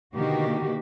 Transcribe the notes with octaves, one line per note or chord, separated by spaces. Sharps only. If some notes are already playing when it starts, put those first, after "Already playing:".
B2 D3 D#3 A#3 F#4 G4